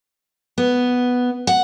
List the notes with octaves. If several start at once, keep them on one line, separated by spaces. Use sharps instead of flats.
B3
F#5